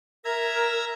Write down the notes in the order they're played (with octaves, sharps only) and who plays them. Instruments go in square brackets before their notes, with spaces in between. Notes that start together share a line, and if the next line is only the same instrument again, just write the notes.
[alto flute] A#4 [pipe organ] E5 A#5 G#6